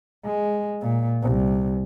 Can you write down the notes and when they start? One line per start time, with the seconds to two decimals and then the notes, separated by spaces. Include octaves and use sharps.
0.24 G#3
0.81 A#2
1.22 C2